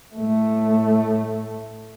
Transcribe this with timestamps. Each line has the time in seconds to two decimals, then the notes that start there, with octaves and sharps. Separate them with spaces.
0.16 A2 A3